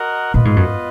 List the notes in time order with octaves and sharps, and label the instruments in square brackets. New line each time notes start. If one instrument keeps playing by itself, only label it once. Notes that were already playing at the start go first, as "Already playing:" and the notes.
Already playing: [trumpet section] F#4 A#4 D#5 F#5
[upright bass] A#2 [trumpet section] B3 F4 B4 D#5
[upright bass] G#2
F#2